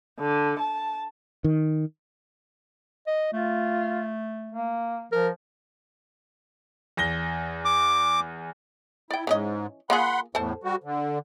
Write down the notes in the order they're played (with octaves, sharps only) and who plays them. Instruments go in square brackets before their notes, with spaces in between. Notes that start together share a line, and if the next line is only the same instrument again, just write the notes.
[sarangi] D3
A5
[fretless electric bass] D#3
[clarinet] D#5
[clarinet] A3 [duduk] F4
[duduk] A#3
[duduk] F3 [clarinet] A#4
[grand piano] E2 A#6 G7
[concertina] D6
[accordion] E4 [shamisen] D5 G5
[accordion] G#2 [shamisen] E3 C#4 D#5
[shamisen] A#3 F4 G#4 [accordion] F#5 B5 C6
[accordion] E2 A2 [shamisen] A4 C5 A5
[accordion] G3 F#4
D3